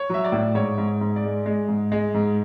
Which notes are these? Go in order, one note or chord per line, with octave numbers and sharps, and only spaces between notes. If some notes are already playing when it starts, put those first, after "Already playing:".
Already playing: C#5
F#3 E5
D5
A2
G#2 C#5
G#2
G#2
D5
G#3
G#3
G#2
G#3
G#2